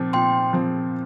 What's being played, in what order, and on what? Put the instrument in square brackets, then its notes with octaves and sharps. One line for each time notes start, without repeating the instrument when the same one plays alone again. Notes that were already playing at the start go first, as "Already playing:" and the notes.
Already playing: [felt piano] A#2 F3 C4
[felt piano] A#2 [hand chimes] G5 C6
[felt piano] F3 C4